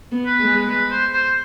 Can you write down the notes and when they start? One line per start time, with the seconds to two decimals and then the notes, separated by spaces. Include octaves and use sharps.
0.12 B3
0.26 B4
0.40 G#3
0.69 B4
0.91 C5
1.13 C5